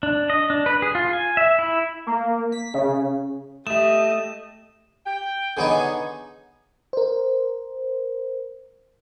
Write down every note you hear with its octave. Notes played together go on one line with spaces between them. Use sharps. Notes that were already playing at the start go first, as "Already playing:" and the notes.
D4
D#5
D4
B4
G#4
F4
G#5
E5
E4
A#3
B6
C#3
A3 G4 D#5 E5 D#6 E7
G5
D3 B3 D#4 G#4 C#5 G#5
A#4 C5